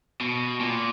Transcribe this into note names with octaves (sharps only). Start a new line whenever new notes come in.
B2
A#2